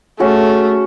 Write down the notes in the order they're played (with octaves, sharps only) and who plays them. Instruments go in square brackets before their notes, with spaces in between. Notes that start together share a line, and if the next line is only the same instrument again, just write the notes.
[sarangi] A3 [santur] C#4 F#4 G#4